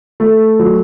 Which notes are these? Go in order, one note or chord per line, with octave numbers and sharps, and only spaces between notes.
A3
F#3